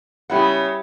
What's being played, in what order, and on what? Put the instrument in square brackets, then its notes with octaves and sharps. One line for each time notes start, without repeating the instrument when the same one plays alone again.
[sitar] C#3 B3 [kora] G3 E4 F#5